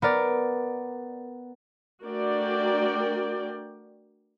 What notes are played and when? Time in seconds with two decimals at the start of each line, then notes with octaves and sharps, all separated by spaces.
0.02 B3 A#4 D5
2.04 A3 D4 F#4 A#4 D5 G5